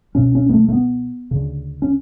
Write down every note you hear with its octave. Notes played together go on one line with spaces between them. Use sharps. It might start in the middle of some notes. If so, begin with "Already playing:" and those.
C#2 B2 C#4
C#4
B3
A3
A3
B3
D2 C#3
C#4